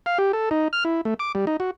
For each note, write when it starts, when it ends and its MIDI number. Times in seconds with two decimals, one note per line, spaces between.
0.06 0.18 77
0.18 0.32 67
0.33 0.49 69
0.51 0.68 63
0.73 0.84 89
0.85 1.01 64
1.05 1.14 57
1.19 1.32 86
1.35 1.45 55
1.47 1.57 63
1.60 1.71 66